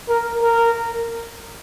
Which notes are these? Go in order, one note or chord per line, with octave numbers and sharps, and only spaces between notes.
A#4
A#4